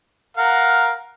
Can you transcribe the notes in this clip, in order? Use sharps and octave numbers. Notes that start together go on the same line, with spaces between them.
A#4 F5 F#5